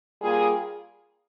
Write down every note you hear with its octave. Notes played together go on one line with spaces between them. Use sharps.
G3 A#3 F4 G#4